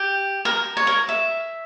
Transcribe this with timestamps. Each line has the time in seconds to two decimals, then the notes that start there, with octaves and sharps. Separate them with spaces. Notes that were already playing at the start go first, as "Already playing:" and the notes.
Already playing: G4
0.45 A#4
0.77 C#5
0.87 A#4
1.09 E5